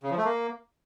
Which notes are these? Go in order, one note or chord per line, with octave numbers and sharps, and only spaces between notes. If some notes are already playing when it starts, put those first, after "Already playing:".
C#3
F3
A3
A#3